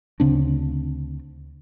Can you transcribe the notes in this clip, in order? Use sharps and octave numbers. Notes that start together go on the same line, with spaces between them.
D2 C#3 C4 D4